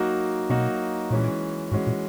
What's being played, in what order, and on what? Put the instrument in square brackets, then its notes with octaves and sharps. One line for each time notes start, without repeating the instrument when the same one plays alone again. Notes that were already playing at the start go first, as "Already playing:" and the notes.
Already playing: [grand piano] F#3 A#3 D#4 F#4
[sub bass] B2 [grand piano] F#3 A#3 D#4 F#4
[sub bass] A#2 [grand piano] E3 G#3 C#4 F#4
[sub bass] G#2 [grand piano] E3 G#3 C#4 F#4
[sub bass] A#2